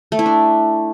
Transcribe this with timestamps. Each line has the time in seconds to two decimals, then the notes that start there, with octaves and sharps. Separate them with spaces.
0.12 A3
0.19 E4
0.26 D4